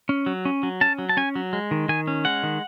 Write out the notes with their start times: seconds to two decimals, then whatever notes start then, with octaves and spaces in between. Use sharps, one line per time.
0.09 C#4
0.26 F#3
0.45 C#4
0.63 F#3
0.81 C#4 A5
0.99 F#3
1.09 A5
1.17 C#4 G#5
1.36 F#3
1.53 G#3
1.71 D#3
1.89 D#3 G#5
2.07 C#4
2.25 G#3 F#5
2.43 D#3